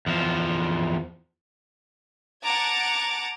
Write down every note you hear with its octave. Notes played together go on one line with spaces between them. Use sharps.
E2 F3
F#5 A5 A#5 D6 G#6